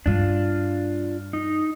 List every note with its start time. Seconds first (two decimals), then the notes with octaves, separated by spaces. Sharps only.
0.06 G2 G3 D4 F4
1.33 D#4